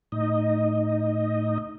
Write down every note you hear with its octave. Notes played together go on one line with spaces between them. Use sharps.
A2 D#4 D#5